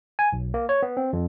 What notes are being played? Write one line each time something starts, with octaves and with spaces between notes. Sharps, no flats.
G#5
B1
A#3
C#5
B3
C4
F2